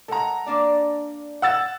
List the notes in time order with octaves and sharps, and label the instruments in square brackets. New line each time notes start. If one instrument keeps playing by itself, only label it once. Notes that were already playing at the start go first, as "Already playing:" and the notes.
[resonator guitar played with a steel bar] G#3 F#5 [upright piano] A4 A#5
[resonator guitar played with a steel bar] A#3 D4 D5
[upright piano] F#5 E6 A6